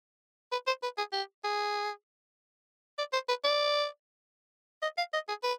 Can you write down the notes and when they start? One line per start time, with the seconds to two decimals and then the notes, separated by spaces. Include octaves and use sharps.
0.52 B4
0.67 C5
0.83 B4
0.98 G#4
1.13 G4
1.44 G#4
2.98 D5
3.13 C5
3.29 B4
3.44 D5
4.82 D#5
4.98 F5
5.13 D#5
5.28 G#4
5.43 B4